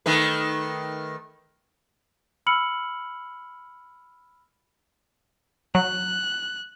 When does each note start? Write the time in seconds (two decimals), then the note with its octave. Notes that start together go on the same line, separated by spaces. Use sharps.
0.06 D#3 A3 B4
2.46 B5 E6 F6 C#7 F#7
5.75 F#3 F#6